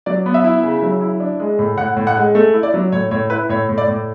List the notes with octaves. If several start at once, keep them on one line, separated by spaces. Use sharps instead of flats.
F#3 D5
B3
E5
E4
C#3
F#3
E4
D4
G#3
A2
A2 F#5
A2
F#5
G#3
A3
E4
D5
F#3
A2 C#5
A2 C#5
E4 B4
A2 C#5
A2
D5
A2